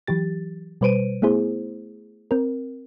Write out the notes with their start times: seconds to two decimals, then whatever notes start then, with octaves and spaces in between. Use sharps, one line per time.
0.07 E3 F#3 G4 A6
0.81 B2 G3 B4 C5 D7 D#7
1.22 A3 B3 E4 G#4 C5
2.31 C4 A#4